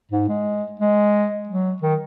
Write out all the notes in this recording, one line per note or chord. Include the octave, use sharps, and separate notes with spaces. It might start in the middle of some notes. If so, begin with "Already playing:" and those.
G#2
G#3
G#3
F#3
D#3